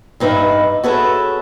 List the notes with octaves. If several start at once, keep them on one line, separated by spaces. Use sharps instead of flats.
G2 D#4 B4 E5 F5
F#4 G#4 A4 B4 C#5 E5